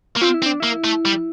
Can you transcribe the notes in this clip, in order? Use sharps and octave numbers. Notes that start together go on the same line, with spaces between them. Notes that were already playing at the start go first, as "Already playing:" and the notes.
A#3
C4 F4
E4
C4
D4
A#3 E4
A3
G3